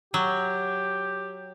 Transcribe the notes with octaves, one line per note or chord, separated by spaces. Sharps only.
F#3 G4